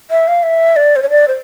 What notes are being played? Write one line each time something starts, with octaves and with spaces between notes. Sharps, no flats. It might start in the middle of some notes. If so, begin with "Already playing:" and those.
E5
F5
E5
D5
C5
C#5
D5
C5